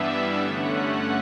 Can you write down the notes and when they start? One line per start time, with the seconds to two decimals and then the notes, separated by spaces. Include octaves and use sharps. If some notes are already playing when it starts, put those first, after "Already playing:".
Already playing: G2 E3 G3 B3 D4 E5
0.36 G2 D3 A3 C#4 F#5
0.66 F#5